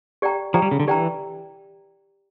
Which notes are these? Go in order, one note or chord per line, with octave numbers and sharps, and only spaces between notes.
G4 D5 G5 A#5
F3 G4 D5 G5 A#5
G3
C#3
D3
E3 G4 D5 G5 A#5